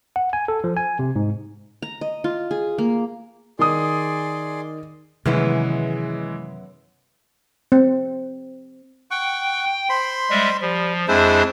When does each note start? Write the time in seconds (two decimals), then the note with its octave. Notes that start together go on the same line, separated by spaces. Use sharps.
0.16 F#5
0.33 G#5
0.48 A4
0.64 F3
0.77 G#5
0.99 C3
1.16 G#2
1.82 A#5
2.01 D#5
2.24 F4
2.51 G#4
2.78 A#3
3.59 D#3 G#4 D5 C6 D#6
5.26 F#2 C3 D#3 E3 G#3 A3 B3 E4
7.72 C4
9.11 F#5 G5 C#6
9.89 C5 B5 C6
10.30 G3 G#3 E5
10.61 F3 G3
11.08 F2 G#3 D4 E4 G#4 C5